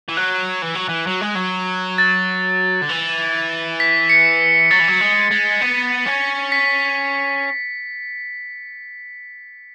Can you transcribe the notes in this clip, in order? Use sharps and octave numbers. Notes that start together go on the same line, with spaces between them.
E3
F#3 F#6
E3
F#3
E3
F#3
G#3
F#3
A6
D3
E3
B6
C#7
F#3 A6
E3
F#3
G#3
G#3
B3
C#4
B6